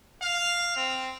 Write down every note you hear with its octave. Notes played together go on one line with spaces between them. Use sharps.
F5
C4